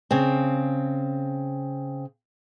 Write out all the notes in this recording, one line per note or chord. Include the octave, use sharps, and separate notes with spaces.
C#3 C4